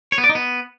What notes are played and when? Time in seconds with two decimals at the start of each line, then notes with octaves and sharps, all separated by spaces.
0.12 C#5
0.18 B3
0.24 D5
0.29 D#4
0.35 B3